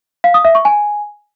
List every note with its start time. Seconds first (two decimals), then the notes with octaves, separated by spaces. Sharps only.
0.24 F5
0.34 D#6
0.45 E5
0.55 C#6
0.65 G#5